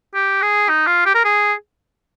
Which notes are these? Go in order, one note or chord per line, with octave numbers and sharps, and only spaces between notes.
G4
G#4
D#4
F4
G4
A#4
G#4